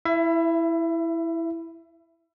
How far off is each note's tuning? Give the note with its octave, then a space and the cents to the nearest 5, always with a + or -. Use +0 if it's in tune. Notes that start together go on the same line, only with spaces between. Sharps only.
E4 +0 E5 +30